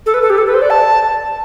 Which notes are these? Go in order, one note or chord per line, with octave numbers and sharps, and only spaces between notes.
A4
B4
A4
G4
A4
B4
C5
D5
A5